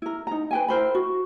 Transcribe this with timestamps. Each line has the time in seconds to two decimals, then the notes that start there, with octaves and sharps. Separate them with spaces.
0.02 E4 A#4
0.27 D#4 A#5
0.51 B4 G5 G#5
0.68 E4 A#4 C5 B5
0.95 F#4